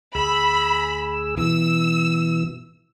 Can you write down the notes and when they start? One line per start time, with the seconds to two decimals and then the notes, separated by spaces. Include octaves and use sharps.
0.15 D2 G#4 B5 E6
1.37 B2 E3 E6